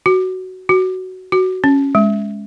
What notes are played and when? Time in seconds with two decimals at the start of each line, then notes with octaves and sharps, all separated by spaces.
0.06 F#4
0.69 F#4
1.32 F#4
1.64 C#4
1.95 G#3